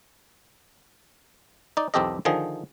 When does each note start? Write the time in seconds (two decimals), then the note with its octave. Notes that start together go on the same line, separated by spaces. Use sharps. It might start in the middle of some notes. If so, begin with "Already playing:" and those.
1.77 D#4 D5
1.94 B1 E2 C4 G4 A4 D#5
2.25 D3 D#3 F3 G#4